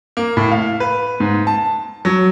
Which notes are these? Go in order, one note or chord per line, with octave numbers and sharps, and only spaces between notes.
A#3
A2
F5
B4
G#2
A5
F#3